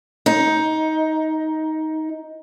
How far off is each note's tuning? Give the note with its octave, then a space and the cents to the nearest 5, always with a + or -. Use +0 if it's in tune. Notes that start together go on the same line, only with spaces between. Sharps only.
D#4 +15